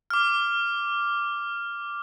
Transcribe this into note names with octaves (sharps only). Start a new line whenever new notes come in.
D6 F6